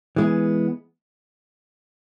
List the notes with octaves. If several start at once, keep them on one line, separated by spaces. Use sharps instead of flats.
E3 G#3 B3